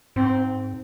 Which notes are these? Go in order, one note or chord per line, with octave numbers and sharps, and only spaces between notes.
G#2 C4